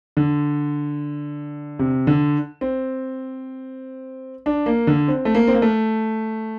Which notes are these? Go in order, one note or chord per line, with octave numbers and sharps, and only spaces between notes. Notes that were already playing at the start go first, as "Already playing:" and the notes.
D3
C3
D3
C4
D4
A#3
D3
C4
A3
A#3
C4
A#3
A3